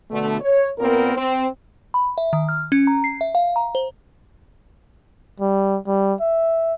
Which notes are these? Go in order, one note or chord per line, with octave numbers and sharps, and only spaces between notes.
B2 D3 A3
C#5
A#2 B3 C4 A#4
C4
B5
E5
D#3
F6
C#4
A#5
C7
E5
F5
A#5
C5
G3
G3
E5